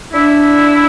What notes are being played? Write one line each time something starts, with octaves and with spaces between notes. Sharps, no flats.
D4 E4